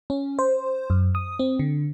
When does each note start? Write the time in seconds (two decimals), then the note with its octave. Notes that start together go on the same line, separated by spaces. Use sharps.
0.10 C#4
0.39 C5
0.90 F#2
1.15 D#6
1.39 C4
1.59 D3